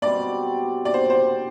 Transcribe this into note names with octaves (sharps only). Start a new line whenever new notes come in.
B2 G3 C4 D5
D5
C5
C5